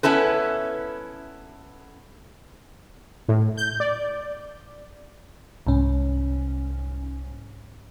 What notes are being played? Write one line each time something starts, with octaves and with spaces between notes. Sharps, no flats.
B3 C#4 E4 A4 B4
A2
G6
D5
C2 G#2 C#4